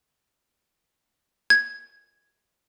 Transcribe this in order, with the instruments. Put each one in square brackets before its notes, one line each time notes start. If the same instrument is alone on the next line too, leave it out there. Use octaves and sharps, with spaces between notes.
[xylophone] G#6